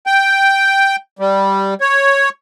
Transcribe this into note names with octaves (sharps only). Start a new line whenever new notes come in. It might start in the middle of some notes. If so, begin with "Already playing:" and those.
G5
G3
C#5